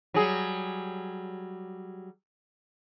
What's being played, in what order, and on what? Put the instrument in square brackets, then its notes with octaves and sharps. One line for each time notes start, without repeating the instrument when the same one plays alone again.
[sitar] F#3 G3 G#4